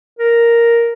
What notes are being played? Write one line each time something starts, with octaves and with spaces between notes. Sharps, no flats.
A#4